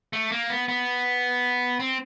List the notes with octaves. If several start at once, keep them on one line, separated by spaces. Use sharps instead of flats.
A3
A#3
B3
B3
C4